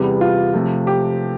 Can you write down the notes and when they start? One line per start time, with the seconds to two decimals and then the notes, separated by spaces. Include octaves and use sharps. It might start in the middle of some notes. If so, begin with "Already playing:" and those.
Already playing: E2 C3 G3 B3
0.21 F4
0.54 C3 F3 A3
0.87 G4